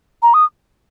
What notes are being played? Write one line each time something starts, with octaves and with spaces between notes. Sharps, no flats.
A#5
D#6